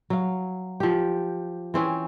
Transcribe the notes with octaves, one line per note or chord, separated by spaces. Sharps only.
F#3 F5
F3 G4
E3 C4 C#4